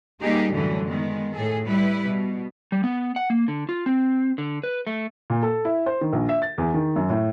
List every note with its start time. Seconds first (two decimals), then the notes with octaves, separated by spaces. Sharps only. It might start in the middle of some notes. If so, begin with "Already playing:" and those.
0.20 G3 A#3 D#4 G4 G#4
0.51 F#2 A2 D3 E3 F#3 G3
0.87 D#3 G#3 B3
1.33 A2 G#4 A4
1.67 G3 E4 B4
2.04 B2
2.72 G3
2.84 B3
3.16 F#5
3.30 A#3
3.48 D3
3.69 F4
3.86 C4
4.38 D3
4.64 B4
4.87 A3
5.30 A#2
5.43 A4
5.65 E4
5.86 C5
6.01 D#3
6.13 A#1
6.29 E5
6.42 A6
6.58 E2
6.74 D#3
6.96 F#2
7.10 A2